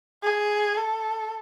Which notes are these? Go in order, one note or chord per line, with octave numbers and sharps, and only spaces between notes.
G#4
A4